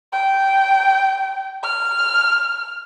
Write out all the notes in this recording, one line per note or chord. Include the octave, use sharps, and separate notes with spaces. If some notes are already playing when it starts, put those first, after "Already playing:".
G5
F6